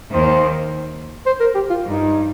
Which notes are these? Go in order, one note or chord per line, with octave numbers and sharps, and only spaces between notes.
D#2 D#3 C5
C5
A#4
G4
F4
G2 D#4